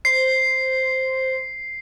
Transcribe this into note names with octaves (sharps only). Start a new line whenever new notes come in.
C5 C7